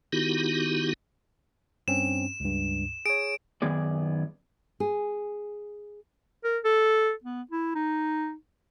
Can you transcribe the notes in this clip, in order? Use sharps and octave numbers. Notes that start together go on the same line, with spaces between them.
D#3 B3 D#4 E4 F#4 G4
G2 C4 C#4 E7
C#2 G2
G#4 C#5 D7
F#2 D#3 B3 G#4 D5
G#4
A#4
A4
B3
E4
D#4